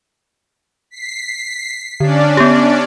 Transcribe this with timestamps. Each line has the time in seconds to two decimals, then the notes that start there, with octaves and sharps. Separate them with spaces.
0.91 B6 C7
2.00 D3 C#4 D4 D5
2.37 B3 G4